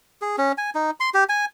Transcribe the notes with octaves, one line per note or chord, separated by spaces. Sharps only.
G#4
C#4
G#5
D#4
C6
G4
G#5